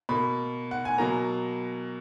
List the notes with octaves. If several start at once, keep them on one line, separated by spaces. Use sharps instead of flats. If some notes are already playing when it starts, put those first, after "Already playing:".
B2 A#3 B5
F#5
G#5
B2 F#3 A#3 A#5